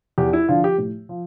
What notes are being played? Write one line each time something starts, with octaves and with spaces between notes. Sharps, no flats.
E2 G4
E4
D3 F3 F4
G4
A2
F3